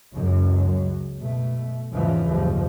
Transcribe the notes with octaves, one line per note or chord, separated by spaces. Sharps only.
C#2 F#2 F#3
B2 A3
E2 G#2 C#3 E3 F3
F#1 D#2 G#2 F3